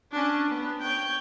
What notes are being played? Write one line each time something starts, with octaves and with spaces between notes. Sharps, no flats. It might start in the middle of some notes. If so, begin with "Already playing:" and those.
C#4 D4
B3
C#5 G5